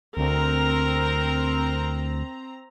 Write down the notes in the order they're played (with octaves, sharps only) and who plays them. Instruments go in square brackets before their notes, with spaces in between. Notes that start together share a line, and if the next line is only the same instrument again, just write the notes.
[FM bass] D2 [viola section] C4 A#5 [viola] A#4